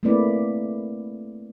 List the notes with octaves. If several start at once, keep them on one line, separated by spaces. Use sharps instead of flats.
A3 A#3 C4 E4 B4 D5